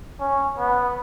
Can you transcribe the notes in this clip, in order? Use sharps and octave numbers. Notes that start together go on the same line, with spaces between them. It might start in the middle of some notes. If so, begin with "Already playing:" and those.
C#4
B3